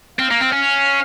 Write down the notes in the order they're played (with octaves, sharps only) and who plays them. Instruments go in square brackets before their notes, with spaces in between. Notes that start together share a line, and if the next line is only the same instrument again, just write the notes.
[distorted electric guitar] C4 [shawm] F5
[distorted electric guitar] A#3
C4
C#4